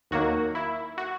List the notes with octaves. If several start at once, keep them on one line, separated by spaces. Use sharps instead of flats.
D#2 D#3 F#3 A#3 F#4
E4
F#4